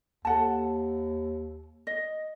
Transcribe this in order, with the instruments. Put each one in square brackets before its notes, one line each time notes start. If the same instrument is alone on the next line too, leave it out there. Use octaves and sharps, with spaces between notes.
[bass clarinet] D#2 [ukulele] A4 F#5 A5
[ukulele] D#5